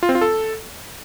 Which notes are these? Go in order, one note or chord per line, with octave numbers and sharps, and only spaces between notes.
F4
C4
F4
A4